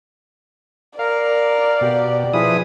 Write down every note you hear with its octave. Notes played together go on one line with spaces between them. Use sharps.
A#4 D5 F5
B2 G4
F3 E4 G#4 B4 D#6